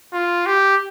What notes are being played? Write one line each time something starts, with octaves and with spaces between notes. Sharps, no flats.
F4
G4